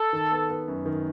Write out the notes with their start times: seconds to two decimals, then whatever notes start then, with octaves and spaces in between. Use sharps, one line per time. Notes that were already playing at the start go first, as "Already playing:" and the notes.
Already playing: A4
0.13 D#3
0.31 B3
0.49 B3
0.68 F#2
0.86 D#3